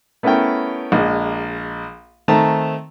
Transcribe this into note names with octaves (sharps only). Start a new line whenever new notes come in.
A3 B3 C#4 E4 A#4 G5
A#1 G#3 A#3 D#5
D#3 A3 C4 A5 A#5